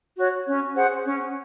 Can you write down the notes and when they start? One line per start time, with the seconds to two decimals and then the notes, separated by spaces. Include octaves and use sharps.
0.17 F#4 C#5
0.47 C#4
0.75 G#4 C5 F#5
1.04 C#4